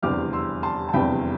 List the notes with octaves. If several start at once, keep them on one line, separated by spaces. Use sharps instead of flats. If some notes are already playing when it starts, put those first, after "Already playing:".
F1 E2 D3 G3 C4 D6 F6
C6 E6
A5 C6
A5
F1 E2 D3 G3 C4 G5 B5